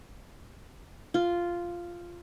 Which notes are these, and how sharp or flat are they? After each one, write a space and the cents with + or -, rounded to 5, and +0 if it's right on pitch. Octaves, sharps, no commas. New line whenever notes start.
F4 -5